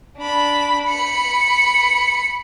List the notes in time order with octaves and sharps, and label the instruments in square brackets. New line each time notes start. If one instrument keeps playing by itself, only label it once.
[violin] D4 B5
B5 C#7